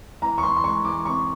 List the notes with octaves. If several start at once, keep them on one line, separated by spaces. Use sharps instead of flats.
E3 A#5
C#6
E3 C6
C6
G#3 C#6
E3 D6
C3 C#6